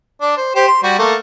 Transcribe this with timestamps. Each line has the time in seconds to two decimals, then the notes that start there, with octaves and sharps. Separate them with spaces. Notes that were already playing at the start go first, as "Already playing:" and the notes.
0.21 D4
0.37 C5
0.56 G4 C5
0.68 C6
0.83 G3 F#4
0.99 A3 A#3